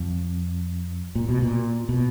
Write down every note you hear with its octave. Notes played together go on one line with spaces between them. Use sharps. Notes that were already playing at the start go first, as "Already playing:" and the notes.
Already playing: F2
A#2
B2
A#2
B2